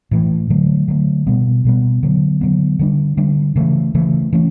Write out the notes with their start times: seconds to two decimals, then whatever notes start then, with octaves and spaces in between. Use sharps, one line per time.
0.11 A2 E3 A3
0.50 D3 F#3 A3
0.88 D3 F#3 A3
1.27 B2 G3 B3
1.65 B2 G3 B3
2.03 D3 F#3 B3
2.41 D3 F#3 B3
2.79 D3 G3 D4
3.17 D3 G3 D4
3.56 C#3 E3 A3
3.95 C#3 E3 A3
4.33 E3 A3 C#4